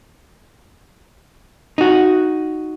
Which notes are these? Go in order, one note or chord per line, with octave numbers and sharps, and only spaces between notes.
D#4 F#4